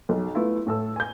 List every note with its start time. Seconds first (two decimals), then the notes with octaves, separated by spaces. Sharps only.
0.09 B1
0.34 A3 B3 E4 F4
0.67 A2 A4 E6
0.96 G#5 G6